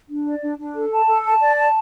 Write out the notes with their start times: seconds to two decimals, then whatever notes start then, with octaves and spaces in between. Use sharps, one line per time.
0.09 D4
0.25 D5
0.42 D4
0.58 D4
0.75 A4
0.91 A5
1.07 A4
1.25 A5
1.40 D5
1.58 A5